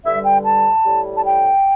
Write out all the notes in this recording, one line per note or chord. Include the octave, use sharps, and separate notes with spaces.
G2 D3 G3 E5
G5
A5
A2 G3
A5
G5